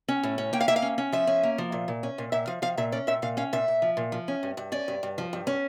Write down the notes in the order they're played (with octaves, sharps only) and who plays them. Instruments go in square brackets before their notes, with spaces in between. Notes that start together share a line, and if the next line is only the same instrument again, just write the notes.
[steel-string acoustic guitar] C#4
A2
C#4
A#3 G5
F5
A#3 E5
F5
C#4
C#4
F3 E5
C#4
A#3
F3
A#2
A#2
C#4
A#2
A#2 E5
F3 F5
F3 F5
A#2 E5
C#4 D5
A#2 E5
A#2 F5
C#4 F5
A#2 E5
A#2
F3
A#2
F3
C#4
G2
G2
C#4 D5
G2
G2
F3
G2
C#4